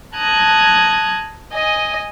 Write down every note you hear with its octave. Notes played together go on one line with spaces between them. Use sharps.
A5 A#5 D#6 F#6 G#6
D#5 G#5